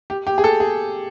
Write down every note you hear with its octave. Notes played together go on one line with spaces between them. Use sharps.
G4
G4
G#4
A4
G#4